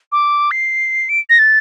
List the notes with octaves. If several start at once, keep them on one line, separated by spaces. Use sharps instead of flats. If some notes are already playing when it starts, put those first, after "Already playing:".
D6
C7
D7
A#6
A6